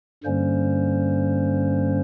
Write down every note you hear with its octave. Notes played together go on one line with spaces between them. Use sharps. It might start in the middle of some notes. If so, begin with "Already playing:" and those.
G2 D3 G3 A#3 C#4 C5